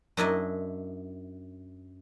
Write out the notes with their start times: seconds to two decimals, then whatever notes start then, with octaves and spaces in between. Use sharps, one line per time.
0.17 F#2 D4 E4 D#5